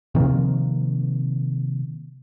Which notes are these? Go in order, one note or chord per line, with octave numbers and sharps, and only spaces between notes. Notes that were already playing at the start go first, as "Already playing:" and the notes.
C3 D#3 F3 A#3